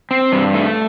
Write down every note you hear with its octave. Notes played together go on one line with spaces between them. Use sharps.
C4
G2
A3